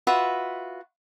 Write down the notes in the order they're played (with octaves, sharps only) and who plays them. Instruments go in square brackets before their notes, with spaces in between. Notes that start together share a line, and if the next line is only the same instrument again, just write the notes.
[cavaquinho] F4 F#4 B4 E5